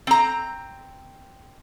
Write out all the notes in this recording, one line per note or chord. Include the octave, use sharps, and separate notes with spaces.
C4 A#5